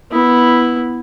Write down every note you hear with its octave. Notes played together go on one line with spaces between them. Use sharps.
B3 E4